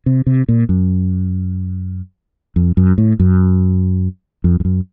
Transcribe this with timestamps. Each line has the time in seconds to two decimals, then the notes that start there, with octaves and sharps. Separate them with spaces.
0.06 C3
0.27 C3
0.49 A#2
0.69 F#2
2.56 F2
2.77 F#2
2.98 A2
3.19 F#2
4.44 F2
4.60 F2
4.65 F#2